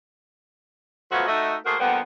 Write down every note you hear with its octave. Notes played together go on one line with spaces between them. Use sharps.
F3 F#3 A3 B3 F4 F#4
A3 D#4 F#4 A4 D#5 E5
A3 A#3 F#4 G#4 A#4 C5
D3 F3 G3 A#3 B3